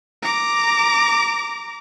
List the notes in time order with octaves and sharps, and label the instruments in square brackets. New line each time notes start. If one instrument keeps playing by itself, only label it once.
[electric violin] A#5 D6